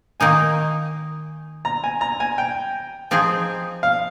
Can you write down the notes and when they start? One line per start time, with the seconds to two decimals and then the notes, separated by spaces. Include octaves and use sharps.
0.20 D#3 A#3 D#4 G#5
1.65 A#5
1.84 G#5
2.01 A#5
2.20 G#5
2.38 G5
3.11 F3 C4 D#4 G#4
3.83 F5